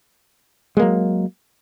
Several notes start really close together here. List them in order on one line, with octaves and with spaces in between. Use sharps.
G#3 A#3 F#3